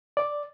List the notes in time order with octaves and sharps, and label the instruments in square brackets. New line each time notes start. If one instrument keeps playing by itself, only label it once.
[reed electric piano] D5